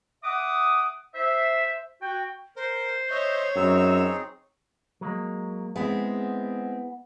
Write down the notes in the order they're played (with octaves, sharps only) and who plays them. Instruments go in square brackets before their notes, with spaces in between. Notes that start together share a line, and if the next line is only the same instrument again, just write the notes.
[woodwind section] E5 F#5 D6 D#6
C5 E5
F#4 G5
[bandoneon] A#4 [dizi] C5
[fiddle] C#5 [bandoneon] D#5 E5
[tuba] F#2 [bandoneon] C4 D#4 G#4 [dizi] E6
[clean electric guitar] F#3 G#3 A#3
[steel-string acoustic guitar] G#3 C4 [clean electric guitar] B3 E4 G#4